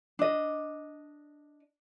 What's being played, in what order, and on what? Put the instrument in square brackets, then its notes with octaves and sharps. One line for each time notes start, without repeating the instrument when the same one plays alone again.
[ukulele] D4 D#5